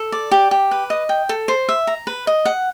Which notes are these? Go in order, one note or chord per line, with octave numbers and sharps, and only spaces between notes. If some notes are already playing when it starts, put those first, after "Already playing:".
Already playing: A4
D5
G4
G4
B4
D#5
G5
A4
C5
E5
A#5
B4
D#5
F#5